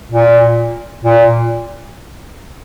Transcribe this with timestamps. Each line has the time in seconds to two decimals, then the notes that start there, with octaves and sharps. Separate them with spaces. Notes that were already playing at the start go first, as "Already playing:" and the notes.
0.12 A#2
1.04 A#2